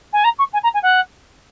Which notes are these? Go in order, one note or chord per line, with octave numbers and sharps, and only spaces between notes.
G#5
A#5
C#6
G#5
A#5
G#5
F#5